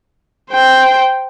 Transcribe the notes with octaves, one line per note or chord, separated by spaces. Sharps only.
C5 G5